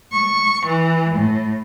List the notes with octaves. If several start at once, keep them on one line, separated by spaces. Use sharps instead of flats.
C#6
E3
A2